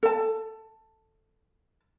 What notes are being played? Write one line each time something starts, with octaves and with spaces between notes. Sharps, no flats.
A4 A5